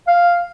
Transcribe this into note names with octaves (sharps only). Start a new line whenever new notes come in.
F5